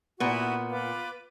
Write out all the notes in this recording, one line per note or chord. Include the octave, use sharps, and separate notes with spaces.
A#2 B3 E4 F#4 B5
F4 B4 D6